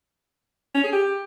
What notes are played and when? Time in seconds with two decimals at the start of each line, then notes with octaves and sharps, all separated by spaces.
0.75 C#4
0.84 G#4
0.92 G4